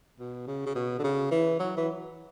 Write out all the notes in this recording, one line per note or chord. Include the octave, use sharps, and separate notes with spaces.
B2
C#3
C#3
B2
D3
C#3
E3
F#3
E3